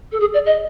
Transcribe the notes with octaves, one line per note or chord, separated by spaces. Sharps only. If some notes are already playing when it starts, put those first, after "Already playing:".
A4
G#4
D5
D#5